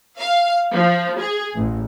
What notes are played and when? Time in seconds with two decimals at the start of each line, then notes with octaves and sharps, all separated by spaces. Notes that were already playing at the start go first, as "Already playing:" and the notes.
0.18 F5
0.72 F3
1.19 G#4
1.55 A1